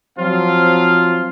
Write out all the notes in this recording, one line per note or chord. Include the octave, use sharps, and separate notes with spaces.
F3 F#3 C4 F4 F5